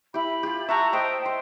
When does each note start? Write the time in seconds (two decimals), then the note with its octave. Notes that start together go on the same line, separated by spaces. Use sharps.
0.14 E4 G4 B5
0.43 F4 G4
0.68 E5 F#5 A5 A#5 C#6
0.93 C5 D#5 E5 G5
1.26 C6